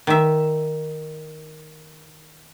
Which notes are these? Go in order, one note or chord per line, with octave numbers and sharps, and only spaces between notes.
D#3 E5